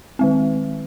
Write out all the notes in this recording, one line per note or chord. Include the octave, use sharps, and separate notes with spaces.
D#3 G#3 C4